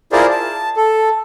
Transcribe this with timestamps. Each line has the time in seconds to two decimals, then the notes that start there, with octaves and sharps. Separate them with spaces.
0.12 E4 F4 G#4 A#4 C5 D5
0.30 A5
0.76 A4